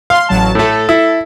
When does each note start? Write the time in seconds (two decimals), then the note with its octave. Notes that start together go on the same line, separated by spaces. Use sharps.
0.10 F5 C6
0.29 A1 F#3 A5
0.55 A2 A3 A4
0.89 E4